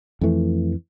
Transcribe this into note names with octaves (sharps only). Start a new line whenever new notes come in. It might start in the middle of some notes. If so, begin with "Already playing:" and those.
F2 E3 A3